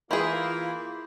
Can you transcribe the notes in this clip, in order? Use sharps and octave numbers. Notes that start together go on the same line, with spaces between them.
E3 A#3 E4 F4 G#4 B5 C6 G6